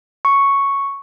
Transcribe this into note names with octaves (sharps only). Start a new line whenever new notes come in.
C#6